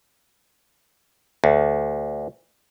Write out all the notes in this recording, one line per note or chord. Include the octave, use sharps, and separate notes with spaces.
D2